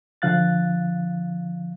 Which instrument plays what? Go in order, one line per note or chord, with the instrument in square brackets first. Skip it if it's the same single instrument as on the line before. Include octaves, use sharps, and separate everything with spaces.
[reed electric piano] D3 F3 F5 F#6 A6